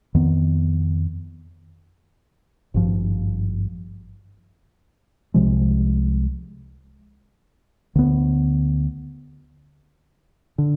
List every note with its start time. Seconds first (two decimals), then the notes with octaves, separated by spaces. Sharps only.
0.15 F2 D#3 B3
2.74 G#1 G2 F3
5.34 C2 C3 F3 G#3
7.95 D2 D3 G3 B3
10.58 D3